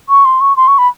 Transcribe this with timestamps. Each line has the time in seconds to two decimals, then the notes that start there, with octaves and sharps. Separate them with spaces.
0.09 C#6
0.25 C6
0.41 C#6
0.57 C6
0.68 C#6
0.78 B5